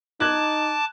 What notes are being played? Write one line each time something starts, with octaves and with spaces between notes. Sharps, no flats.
D#4 A5 D6 F#6 G#6